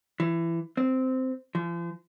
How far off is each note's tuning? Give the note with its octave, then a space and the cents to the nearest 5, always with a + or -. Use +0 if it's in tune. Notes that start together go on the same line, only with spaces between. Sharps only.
E3 +20
C4 -10
F3 -40